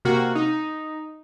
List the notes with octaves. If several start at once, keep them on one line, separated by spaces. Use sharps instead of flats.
C3 A#3 F#4
D#4